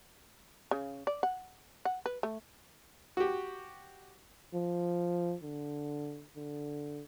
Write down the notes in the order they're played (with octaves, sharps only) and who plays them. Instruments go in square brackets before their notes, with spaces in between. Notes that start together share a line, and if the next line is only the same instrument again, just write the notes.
[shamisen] C#3
D5
F#5
F#5
B4
A3
[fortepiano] F#4 G4
[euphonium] F3
D3
D3